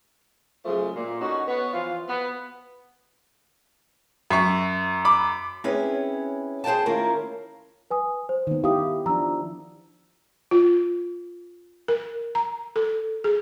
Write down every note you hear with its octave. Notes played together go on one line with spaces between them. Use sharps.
C#3 F3 F#3 G#3 A3
A#2
D3 C#4 D#4 F#4
B3 C#5
E3 F3 F4
B3
F#2 E5 C#6
B5 D6
C4 C#4 E4 G#4 B4 C#5
G#4 C5 D5 G5 A5
D#3 A#3 C#4 E4 F4 A#4
B4 G#5 D#6
C5
D#3 B3
E4 G4 F5 D#6
F3 D4 A#5 E6
F4
A#4
A#5
A4
G#4